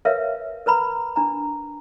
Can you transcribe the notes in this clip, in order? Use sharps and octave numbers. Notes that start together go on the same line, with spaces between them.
A#4 B4 C#5 E5 F5
A#4 B4 A#5 B5
D4 A#5